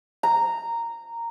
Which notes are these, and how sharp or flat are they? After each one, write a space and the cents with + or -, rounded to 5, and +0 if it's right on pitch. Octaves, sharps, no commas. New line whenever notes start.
A#5 -10